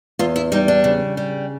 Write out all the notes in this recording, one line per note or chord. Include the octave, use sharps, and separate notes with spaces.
E2 F4
E4
G3 D#4
D4
C#3
G3